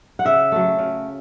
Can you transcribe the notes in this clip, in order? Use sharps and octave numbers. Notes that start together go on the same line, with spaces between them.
F#5
C#3 E5
F#3 A3
C#3